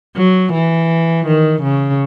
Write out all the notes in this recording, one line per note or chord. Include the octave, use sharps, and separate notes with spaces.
F#3
E3
D#3
C#3